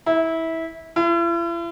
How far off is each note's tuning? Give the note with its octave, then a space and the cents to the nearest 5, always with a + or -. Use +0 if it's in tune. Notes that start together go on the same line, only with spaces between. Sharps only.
E4 -20
E4 +45